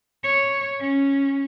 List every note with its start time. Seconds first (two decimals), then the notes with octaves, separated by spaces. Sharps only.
0.23 C#5
0.80 C#4